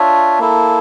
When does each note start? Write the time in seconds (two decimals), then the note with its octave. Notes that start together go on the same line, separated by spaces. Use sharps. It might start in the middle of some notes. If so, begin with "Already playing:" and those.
Already playing: D4 F4 C#5 E5
0.39 A#3 E4 A4